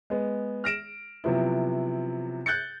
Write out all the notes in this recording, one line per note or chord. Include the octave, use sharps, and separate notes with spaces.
G#3 B3
F6 A#6 D7 E7
C3 F3 F#3 B3 E4
F#6 G6 A6 C#7